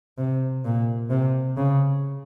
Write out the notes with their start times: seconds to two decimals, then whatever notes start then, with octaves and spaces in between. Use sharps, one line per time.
0.18 C3
0.65 A#2
1.10 C3
1.57 C#3